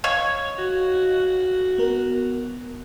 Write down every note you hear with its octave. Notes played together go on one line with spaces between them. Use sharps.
C#5 D#5 F5
F#4
B3 A#4